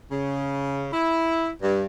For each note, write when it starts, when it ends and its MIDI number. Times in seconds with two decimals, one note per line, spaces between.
0.11 0.87 49
0.93 1.50 64
1.62 1.86 43